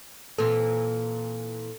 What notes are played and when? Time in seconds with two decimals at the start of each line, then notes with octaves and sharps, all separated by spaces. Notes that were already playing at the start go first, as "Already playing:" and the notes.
0.38 A#2 E3 C4 A4